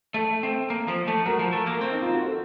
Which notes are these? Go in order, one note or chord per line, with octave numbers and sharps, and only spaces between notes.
A3 A4
C4
A#3
F3
A3
F#3 A#4
F3
A3
A#3
C4
D#4
F4
F#4
A4